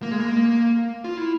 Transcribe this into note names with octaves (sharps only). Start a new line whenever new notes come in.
A#3
G#3
A#3
F4
E4